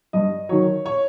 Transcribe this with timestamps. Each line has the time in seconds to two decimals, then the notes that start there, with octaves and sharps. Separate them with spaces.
0.13 G2 D#5
0.49 D#3 F#3 C#5
0.86 C#5